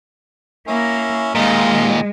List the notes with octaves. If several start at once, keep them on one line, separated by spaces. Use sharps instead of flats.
A#3 C#4 E4
D#2 A#2 G#3 D#4 F4